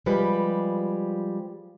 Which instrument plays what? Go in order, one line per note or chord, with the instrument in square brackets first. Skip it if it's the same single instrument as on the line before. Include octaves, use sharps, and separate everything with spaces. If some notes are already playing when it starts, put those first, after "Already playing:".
[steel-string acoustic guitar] F3 G3 G#3 G4 B4